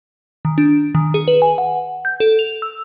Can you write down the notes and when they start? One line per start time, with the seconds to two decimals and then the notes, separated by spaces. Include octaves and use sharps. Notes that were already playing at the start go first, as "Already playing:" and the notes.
0.45 D#3
0.58 D4
0.95 D#3
1.14 G#4
1.28 B4
1.42 G#5
1.58 F#5
2.05 G6
2.20 A4
2.39 F7
2.62 E6